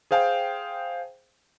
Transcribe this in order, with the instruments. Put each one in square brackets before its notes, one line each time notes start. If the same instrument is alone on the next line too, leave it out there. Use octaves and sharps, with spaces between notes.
[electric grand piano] G#4 C5 F5 G5 A5